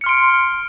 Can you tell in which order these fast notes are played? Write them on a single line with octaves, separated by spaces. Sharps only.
C#7 F6 C6 D7